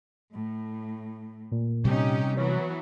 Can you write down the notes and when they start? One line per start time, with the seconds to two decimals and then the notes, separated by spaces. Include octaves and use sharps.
0.34 A2
1.52 A#2
1.85 C3 G3 C#4 D#4 G4
2.37 E3 F#3 B3 C#5